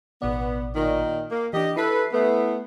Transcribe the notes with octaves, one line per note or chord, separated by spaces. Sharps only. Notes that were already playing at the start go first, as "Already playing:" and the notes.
A1 B2 B3 D5
A#2 D#3
A#3
E3 D4 G4 D#5
E4 A4 B4 C7
A3 B3